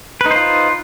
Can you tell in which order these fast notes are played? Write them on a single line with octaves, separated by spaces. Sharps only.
B4 D#4 C5 F4